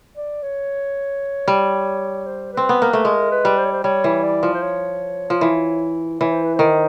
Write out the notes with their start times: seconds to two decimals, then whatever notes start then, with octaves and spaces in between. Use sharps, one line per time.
0.17 D5
0.42 C#5
1.48 G3
2.26 C5
2.53 C4 B4
2.69 B3
2.79 A#3 B4
2.93 A3
3.05 G#3 A#4
3.32 B4
3.45 G3
3.58 C5
3.65 C#5
3.72 C5
3.84 G3 C#5
4.04 E3
4.23 D5
4.43 F3
4.54 C5
4.63 C#5
5.30 F3
5.41 E3
6.20 E3 C#5
6.32 C5
6.44 B4
6.55 D#3 C5